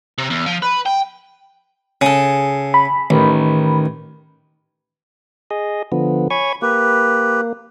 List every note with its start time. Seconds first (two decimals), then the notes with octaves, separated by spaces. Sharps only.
0.18 C3
0.30 E2
0.46 F3
0.62 B4
0.86 G5
2.01 C#3 G#4 A4
2.74 B5
3.10 A1 D#3
5.51 G#4 D#5
5.92 D3 F3 B3
6.30 C#5 G#5 B5 C#6
6.62 A#3 G4 B4